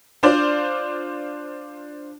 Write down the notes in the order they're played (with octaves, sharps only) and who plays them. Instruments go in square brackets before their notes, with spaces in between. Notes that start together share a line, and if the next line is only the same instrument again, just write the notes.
[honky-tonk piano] D4 F4 C5 D5